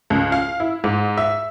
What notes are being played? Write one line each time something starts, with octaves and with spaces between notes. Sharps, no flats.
C#2
F5
E4
G#2
E5